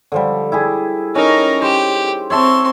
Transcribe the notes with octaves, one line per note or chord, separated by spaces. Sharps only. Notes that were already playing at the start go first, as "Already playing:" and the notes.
D3 F3 G3
E4 G4 G#4
C#4 D#4 A#4
G4 C5
C4 C#5 E5 A5 C6